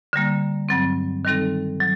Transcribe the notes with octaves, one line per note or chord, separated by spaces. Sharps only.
D3 G3 A#3
G2 F#3 C4
D#3 G3 C4 D#4 A4
F#3